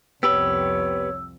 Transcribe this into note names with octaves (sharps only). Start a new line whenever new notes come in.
C2 F2 B3 G4 B4 C#5 E6